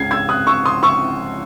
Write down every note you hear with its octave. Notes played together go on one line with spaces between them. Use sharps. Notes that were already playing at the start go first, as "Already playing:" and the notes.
Already playing: C#2 C#3 G#3 G#6 C7
E6 G#6
D#6 F#6
C#6 E6
C6 D#6
C#6 E6